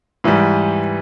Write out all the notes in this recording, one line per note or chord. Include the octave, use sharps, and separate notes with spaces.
G#2 E3 G3